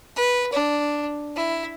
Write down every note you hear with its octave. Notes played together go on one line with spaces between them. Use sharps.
B4
D4
E4